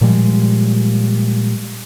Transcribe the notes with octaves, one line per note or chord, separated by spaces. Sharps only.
A#2 F3 G3 G#3